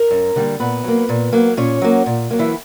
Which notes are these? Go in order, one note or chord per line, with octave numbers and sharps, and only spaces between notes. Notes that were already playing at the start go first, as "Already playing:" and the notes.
Already playing: A#4
F#2
D3 G3 A#3
A#2 B3 B4
F#3 A#3
A#2
F#3 A#3
A#2 C#4 C#5
F#3 A#3
A#2
F#3 A#3
E3 E4